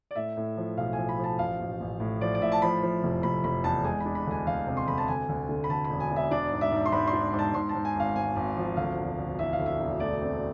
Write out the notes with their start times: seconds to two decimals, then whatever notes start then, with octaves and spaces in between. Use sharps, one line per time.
0.11 D5
0.16 A2 E5
0.37 A2
0.57 F3
0.77 B1 F5
0.93 G#5
0.98 F3
1.09 B5
1.18 F3
1.24 A5
1.39 A1 F5
1.60 A1
1.80 A1
2.00 A2
2.21 F3 D5
2.35 D5
2.41 A2 E5
2.52 A5
2.62 F3 B5
2.83 F3
3.03 F1
3.23 F1 B5
3.44 F1 B5
3.64 E2 A5
3.84 G#3 G#5
4.00 D4 B5
4.15 B5
4.26 D2 G#5
4.46 D2 F5
4.66 C3
4.77 C6
4.87 D2 B5
4.98 A5
5.08 D2 G#5
5.29 D2
5.49 D3
5.64 B5
5.69 D2 A5
5.85 B5
5.90 E1
6.00 G#5
6.11 E1
6.16 E5
6.31 D4 D5
6.52 G#2
6.61 E5
6.72 G#2
6.86 C6
6.92 G#2 B5
7.07 C6
7.13 D4
7.33 G#2
7.39 A5
7.54 G#2 C6
7.69 A5
7.75 G#2
7.85 G#5
7.96 G#1 F5
8.16 G#2 G#5
8.36 G#1
8.57 F3
8.77 D2 F5
8.98 E1
9.18 D2
9.39 E3 E5
9.53 F5
9.59 D2
9.66 E5
9.80 E1
10.00 A3 D5
10.21 C4